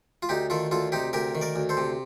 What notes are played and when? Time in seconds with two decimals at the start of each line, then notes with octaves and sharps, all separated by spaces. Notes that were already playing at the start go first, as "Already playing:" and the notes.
0.23 F4
0.29 D2 D#4 G4
0.50 D#3 F4 A4
0.71 D2 F4 A4
0.92 C3 D#4 G4
1.13 D2 G4 A#4
1.35 D#3
1.41 A#4 D5
1.56 D2
1.69 A4 C5
1.77 C3